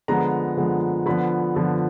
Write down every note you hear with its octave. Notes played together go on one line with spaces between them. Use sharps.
D3 F3 G#3 B3 A#5
D3 F3 G#3 B3
D3 F3 B3 B5
D3 F3 B3